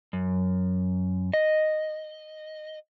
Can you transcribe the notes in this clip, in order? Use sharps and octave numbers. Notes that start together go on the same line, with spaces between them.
F#2
D#5